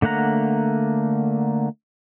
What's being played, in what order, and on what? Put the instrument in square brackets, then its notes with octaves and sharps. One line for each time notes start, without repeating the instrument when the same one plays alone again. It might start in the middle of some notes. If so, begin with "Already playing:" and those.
[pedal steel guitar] D3 A3 A#3 F#5 A#5